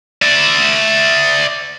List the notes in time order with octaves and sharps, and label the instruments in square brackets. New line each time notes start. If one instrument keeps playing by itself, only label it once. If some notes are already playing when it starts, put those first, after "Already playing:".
[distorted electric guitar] D5 E5